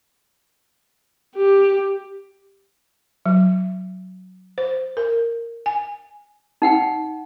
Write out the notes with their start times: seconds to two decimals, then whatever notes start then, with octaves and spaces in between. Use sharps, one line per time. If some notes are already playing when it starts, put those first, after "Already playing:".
1.36 G4
3.26 F#3
4.58 C5
4.97 A#4
5.66 G#5
6.62 D#4 F#5 G5